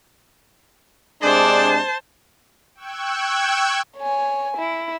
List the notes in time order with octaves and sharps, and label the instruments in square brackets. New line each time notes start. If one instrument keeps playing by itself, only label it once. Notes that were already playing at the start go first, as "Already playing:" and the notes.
[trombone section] C3 G#3 D4 [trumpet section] G#4 D5 [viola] C5 A5
[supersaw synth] G5 C#6 E6 F#6 G#6
[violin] C#5 G#5
E4